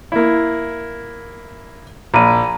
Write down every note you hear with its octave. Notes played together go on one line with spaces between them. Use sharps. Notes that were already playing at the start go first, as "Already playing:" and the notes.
A#3 E4
A#1 A#5 B5 D#7